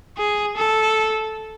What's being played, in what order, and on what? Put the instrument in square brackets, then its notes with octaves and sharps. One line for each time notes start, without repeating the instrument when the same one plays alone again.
[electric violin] G#4
A4